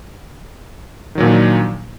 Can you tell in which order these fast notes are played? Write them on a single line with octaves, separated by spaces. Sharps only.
D#3 F#3 A#2 F3 D4